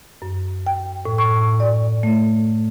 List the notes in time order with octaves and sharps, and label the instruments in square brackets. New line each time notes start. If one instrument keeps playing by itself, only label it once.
[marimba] F#2
G5
A2
C#6
D5
A3